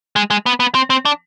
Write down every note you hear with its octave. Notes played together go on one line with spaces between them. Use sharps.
G#3
G#3
B3
B3
C4
C4
D4